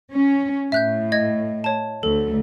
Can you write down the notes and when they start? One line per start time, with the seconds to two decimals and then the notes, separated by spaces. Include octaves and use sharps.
0.11 C#4
0.72 A2 E5 F#6 G6
1.12 D#5 G#6
1.64 C#5 A5
2.03 D2 A3 A4